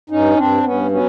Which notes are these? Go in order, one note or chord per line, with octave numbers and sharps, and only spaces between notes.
G2 C#4 D#4
G2 C4 D4
G2 B3 C#4
F#3 B3 C#4